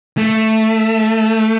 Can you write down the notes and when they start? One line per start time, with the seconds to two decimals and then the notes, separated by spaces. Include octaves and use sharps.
0.18 A3